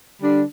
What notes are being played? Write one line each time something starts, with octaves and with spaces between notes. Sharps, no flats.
D3 G3 D4